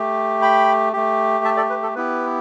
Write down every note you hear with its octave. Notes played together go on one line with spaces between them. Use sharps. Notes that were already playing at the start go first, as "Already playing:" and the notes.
Already playing: A3 G4
G5 B5
A3 G4
E5 A5
A4 D5
B4
A4
B3 E4 G4 B4